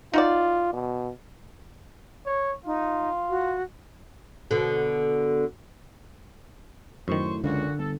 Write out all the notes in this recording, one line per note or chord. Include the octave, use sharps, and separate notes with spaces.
D#4 F4 F#4 D5
B2
C#5
D#4 F4
F#4
B2 D3
F#2 A2 D#3 C5 C#6
C#2 A#2 D3 F#4
G1 A4